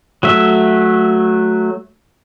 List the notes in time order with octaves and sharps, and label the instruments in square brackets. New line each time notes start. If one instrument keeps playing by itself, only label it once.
[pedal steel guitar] F#3 A3 E5